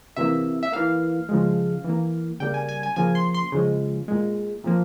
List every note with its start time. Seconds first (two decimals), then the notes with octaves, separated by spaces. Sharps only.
0.16 C3 E3 A#3 E5
0.63 E5
0.72 E3 A#3 F5
1.29 C#3 F3 G#3
1.84 E3 A#3
2.40 C#3 G3 A#3 G5
2.54 G#5
2.69 G#5
2.83 G#5
2.96 C#3 F3 A#3 G#5
3.15 C6
3.34 C6
3.52 C#3 F3 G#3
4.08 A#2 G#3
4.64 A#2 F3 A#3